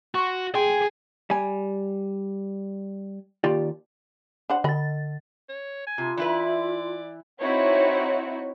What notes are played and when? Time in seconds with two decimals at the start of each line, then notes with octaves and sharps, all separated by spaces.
0.15 F#4 C6 C#6
0.55 G#4 G5 G#5 C6
1.30 G3 G#5
3.44 D#2 F4 G4 D5
4.50 D4 C5 F#5
4.64 D3 D#5 B5 A6
5.49 C#5
5.87 G#5
5.98 C3 F4
6.17 E3 E4 B4 D5
7.39 C4 D#4 E4 F#4 C#5